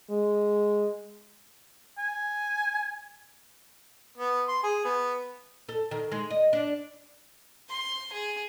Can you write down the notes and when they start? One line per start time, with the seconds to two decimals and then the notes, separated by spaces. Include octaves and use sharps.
0.10 G#3
1.98 G#5
4.18 B3
4.48 C6
4.64 G#4
4.85 B3
5.69 A4
5.91 D#3
6.12 G#3
6.30 D#5
6.53 D4
7.69 C6
8.13 G#4